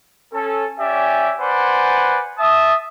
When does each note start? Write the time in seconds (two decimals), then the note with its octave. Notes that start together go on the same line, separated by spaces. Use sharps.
0.33 C#4 A4
0.79 C#4 G4 D5 E5 G#5
1.40 B4 C5 D5 F#5 G#5
2.38 E5 A5 D#6